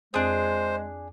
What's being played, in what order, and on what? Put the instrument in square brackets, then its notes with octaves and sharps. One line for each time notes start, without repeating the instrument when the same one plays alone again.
[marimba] F2 C4 D#6 [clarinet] G#3 [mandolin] D4 G#4 [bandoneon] C5